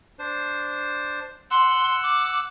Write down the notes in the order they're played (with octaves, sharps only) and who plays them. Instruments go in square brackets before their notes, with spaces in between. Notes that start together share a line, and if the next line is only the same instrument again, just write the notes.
[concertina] D4 C5
[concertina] F#5 E6 F#6 [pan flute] C6
[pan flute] D6